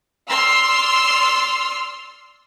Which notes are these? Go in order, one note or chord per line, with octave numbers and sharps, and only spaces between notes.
D5 C6 E6 F6